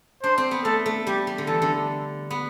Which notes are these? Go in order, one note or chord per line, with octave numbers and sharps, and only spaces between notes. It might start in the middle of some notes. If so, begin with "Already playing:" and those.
D4 C5
C4
B3
A3 A4
A3
G3 G4
G3
D3
E3 A4
D3
B3